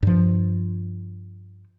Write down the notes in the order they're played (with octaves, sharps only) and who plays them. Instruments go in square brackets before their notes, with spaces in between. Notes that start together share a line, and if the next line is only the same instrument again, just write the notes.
[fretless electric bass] G2 F3